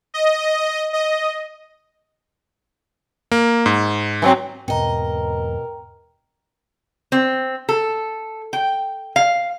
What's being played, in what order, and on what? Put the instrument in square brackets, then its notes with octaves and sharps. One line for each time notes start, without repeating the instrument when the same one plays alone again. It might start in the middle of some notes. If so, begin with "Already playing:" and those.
[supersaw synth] D#5
D#5
[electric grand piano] A#3
G#2
[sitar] E3 F#3 C4
[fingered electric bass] E2 G#2 C4 [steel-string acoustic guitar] B2 D#5 [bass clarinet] A#4 [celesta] G5 A#5
[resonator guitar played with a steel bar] C4
A4
G5
F5